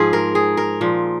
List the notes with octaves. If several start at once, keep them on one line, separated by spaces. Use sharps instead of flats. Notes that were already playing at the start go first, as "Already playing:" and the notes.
Already playing: G#2 F3 G#4
A#4
G#4
A#4
A#2 F3